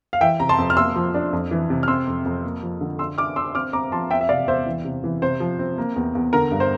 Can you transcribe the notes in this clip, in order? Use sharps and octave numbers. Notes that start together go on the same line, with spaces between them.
F5
E3 E5 G5
C3 A#5
A5 C6
F2
F6
A#3 C6 E6
F3
D4
F2
E3
C3
F6
C4 C6 E6
F2
F2
A#3
F3
D3
D4 C6 E6
D4 D6 F6
D4 C6 E6
C4 D6 F6
C4 A#5 D6
F3 A5 C6
C4 E5 G5
E5
C3 D5 F5
E2 C5 E5
E3
C3
E3
C3 C5
F3
C4
A#3
E2
E2
D3 A#4
G2
C5